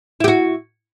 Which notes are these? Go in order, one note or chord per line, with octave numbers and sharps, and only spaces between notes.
E4 F#4 G4